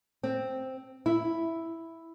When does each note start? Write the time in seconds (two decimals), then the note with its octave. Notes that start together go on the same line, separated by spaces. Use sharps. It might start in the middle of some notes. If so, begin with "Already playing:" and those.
0.23 C4
1.06 E4